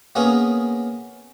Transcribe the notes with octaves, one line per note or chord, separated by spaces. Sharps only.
A#3 B3 C#4 G#4 A#4